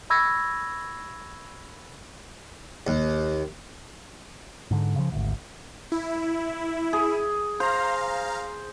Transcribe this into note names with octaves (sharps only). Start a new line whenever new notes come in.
B5 C#6 E6 G#6 A#6
D#2
G#2 D3
C#3 F3
G#1 D2
E4
G#4
C5 F5 A#5